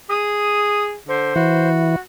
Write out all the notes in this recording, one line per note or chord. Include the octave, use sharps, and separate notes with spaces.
G#4 D#6
D3 C5
E3 F#4